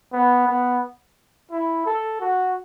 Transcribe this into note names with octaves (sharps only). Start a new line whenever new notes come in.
B3
B3
E4
A4
F#4